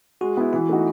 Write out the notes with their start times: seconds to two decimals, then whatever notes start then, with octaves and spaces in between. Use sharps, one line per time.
0.21 G#3 F#4
0.37 B3 E4
0.53 E3 E4
0.69 A3 D#4 F#4